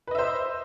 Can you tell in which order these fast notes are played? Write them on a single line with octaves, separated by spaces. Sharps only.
B4 D#5 E5 C5